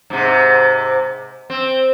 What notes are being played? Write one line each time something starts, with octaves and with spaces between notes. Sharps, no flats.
G#2 C3
C4